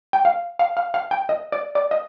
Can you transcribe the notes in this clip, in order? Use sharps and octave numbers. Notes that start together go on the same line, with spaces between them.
G5
F5
F5
F5
F5
G5
D#5
D5
D5
D#5